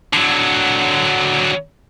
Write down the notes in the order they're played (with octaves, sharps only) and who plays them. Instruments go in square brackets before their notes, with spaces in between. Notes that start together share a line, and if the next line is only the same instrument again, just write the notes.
[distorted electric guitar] D3 F#3